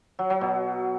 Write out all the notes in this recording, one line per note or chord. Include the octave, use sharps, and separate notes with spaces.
F#3
F#3
B2